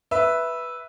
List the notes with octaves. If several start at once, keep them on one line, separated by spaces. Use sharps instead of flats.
B4 E5